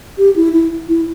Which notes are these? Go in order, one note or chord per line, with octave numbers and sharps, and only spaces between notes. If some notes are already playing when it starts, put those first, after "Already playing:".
G4
E4
E4
E4